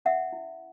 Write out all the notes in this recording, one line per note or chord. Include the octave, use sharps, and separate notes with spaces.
C#4 E5 F#5
E4